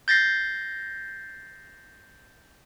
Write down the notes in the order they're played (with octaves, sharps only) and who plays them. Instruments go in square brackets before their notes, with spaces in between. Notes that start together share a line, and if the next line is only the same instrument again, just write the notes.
[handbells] G6 A6 A#6 C7